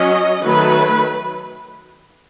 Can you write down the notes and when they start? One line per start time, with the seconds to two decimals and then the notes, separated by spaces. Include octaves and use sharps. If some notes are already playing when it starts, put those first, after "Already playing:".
Already playing: F#3 C#4 D#5
0.42 D#3 F#3 A3 B4